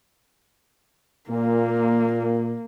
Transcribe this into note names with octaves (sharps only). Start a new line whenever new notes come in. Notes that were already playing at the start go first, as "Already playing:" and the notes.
A#2 A#3